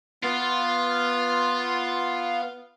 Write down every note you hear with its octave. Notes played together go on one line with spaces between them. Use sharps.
B3 F4